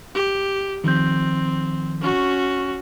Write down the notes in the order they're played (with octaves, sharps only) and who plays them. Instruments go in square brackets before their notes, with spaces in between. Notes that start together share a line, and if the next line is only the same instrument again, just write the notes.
[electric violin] G4
[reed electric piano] D#3 F3 G6 [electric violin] C4
[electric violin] C#4 F#4